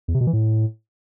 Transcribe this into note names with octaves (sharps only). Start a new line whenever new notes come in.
E2
C3
B2
E3
A2